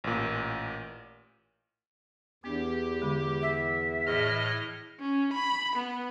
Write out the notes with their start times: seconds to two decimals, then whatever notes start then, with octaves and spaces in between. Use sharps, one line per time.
0.04 A1 A#2
2.44 E2 B3 D4 G4
3.02 D3 G#3
3.42 E5
4.07 A2 E3 G#4 D#5 F6
5.00 C#4
5.34 B5
5.76 B3